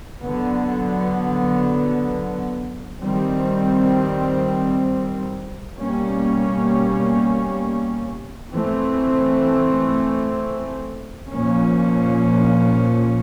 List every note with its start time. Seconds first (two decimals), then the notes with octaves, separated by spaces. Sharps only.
0.24 D3 F#3 B3
3.00 D#3 G3 C4
5.77 B2 G3 A#3 C#4
8.53 E3 A3 C4
11.30 A#2 F3 A#3 C#4